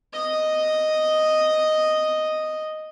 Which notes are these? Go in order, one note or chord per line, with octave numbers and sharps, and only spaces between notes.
D#5 D#6